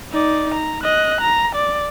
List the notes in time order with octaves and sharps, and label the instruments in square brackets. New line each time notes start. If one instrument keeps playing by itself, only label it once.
[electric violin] D#4 D5
A#5
D#5 F#6
A#5
D5